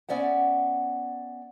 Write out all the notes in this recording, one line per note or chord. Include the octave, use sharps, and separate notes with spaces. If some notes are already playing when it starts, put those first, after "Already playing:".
B3 C#4 D5 E5 F#5